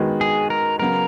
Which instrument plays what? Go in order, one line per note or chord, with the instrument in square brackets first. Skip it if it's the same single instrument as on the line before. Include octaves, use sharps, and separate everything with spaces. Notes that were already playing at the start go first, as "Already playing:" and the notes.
Already playing: [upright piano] D#3 G#3 B3 F#4
[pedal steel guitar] G#4
A#4
[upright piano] C#3 F#3 B3 [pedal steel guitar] A#4